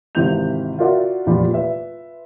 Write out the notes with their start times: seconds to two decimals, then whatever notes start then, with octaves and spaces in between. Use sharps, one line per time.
0.15 G#1 C3 E3 G4 G6 F7
0.79 F4 F#4 A#4 D5 E5 F#5
1.26 F1 E2 A#2 G4 D5 B5
1.54 F4 B4 E5